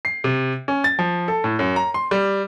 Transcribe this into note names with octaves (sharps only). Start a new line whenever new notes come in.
C7
C3
C#4
A6
F3
A4
A2
F#2
A#5
C6
G3